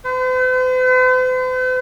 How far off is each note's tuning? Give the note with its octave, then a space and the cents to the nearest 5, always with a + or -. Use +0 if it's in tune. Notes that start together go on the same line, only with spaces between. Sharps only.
C5 -45